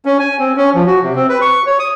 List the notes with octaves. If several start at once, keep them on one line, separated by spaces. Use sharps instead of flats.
C#4
G#5
C4
C#4
F3
F#4
C3
C4
B4
C#6
C#5
D#6